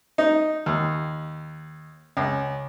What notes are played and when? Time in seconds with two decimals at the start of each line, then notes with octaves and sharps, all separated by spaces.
0.18 D#4
0.66 D#2
2.17 C#2